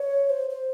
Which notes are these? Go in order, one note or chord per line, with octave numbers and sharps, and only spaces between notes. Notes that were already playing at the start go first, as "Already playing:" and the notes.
Already playing: C#5
C5
C5